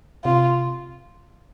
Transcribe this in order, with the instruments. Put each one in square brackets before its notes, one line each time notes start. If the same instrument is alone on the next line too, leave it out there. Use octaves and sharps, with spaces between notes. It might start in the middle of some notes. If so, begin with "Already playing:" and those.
[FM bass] C3 [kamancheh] F4